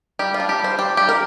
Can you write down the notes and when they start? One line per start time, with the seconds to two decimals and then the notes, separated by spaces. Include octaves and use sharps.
0.19 G3 G4
0.34 F4
0.40 D4
0.49 G4
0.59 G3 C5
0.79 D4 G4
0.97 G3 G4
1.09 A#4